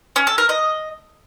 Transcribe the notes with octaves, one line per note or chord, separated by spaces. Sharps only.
C#4
A4
A#4
D#5